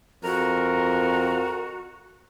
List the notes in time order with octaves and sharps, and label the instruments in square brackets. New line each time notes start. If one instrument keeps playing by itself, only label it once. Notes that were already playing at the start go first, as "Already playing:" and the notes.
[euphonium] F2 [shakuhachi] F#4 [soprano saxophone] A#4